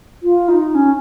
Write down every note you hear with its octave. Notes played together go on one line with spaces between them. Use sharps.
F4
D#4
C#4